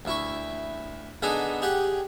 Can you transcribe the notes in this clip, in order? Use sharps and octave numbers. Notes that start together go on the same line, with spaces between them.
D2 E4 C#6
D3 B3 D#4 G#4 A4
G4 G#4 D5 F#5